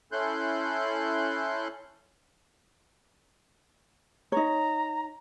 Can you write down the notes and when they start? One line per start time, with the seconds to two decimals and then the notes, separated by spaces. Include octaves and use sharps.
0.12 C#4 E4 A4 C6 F#6 G6
4.32 D#4 C#5 A#5